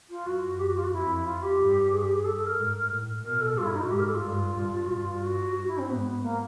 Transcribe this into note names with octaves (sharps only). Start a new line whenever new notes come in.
F4
F#2 F#4
G4
F#4
F4
F#4
F2 E4
F4
G4
G2
G#4
G4
G#4
A4
A4
A#4
G#2
A2
B2 A#4
A4
G2 F4
E4
D#4
F#4
G#2 G4
A#4
A4
F4
G2
G2
F#4
G2 F4
F#4
F#4
E4
C4
G#2 B3
A#3